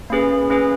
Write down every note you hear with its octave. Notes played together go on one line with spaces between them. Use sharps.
A#3 C#4 G#4 B4
A#3 C#4 G#4 B4